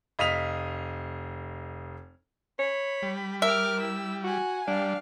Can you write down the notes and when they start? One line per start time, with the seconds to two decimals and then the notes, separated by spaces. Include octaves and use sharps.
0.19 F1 D#5 F5 D#6 B6 F7
2.59 C#5 B5
3.03 G3
3.42 A#4 E5 D6 F6
3.80 E4 E6
4.24 F#4 F#5 G#5
4.68 G3 D4 F5